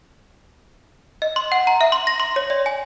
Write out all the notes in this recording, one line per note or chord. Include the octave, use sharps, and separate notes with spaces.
D#5
C6
F#5
A#5
E5
C6
A#6
C6
C#5
D5
G#5